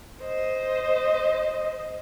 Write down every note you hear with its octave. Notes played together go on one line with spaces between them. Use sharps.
C5 D#5